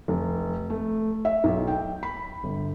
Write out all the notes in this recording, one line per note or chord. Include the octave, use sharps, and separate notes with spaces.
F1
A3
E5
B1
G5
B5
G1